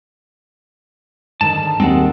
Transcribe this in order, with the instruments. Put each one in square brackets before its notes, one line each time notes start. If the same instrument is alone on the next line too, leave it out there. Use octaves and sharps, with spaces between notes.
[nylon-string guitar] G#2 D3 D#3 [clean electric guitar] A5
[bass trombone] D#2 [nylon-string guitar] G#3 F#5 [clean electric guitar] C4